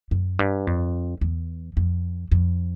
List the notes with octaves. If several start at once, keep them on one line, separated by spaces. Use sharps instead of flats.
F#2
G2
F2
E2
F2
F2